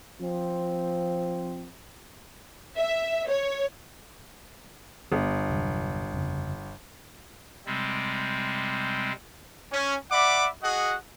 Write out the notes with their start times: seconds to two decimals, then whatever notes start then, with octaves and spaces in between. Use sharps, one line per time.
0.21 F3 C4
2.77 E5
3.28 C#5
5.12 G1
5.49 E2 C3 F#3
6.13 F2 C#3
7.66 C3 G3 G#3 C4
9.72 C#4
10.11 D5 E5 F#5 B5 D6
10.63 F#4 G#4 D#5 F#5